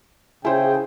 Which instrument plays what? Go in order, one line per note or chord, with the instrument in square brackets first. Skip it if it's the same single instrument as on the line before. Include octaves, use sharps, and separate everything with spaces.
[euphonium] C#3 [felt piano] E4 C5 [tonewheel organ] G#4 [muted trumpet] G5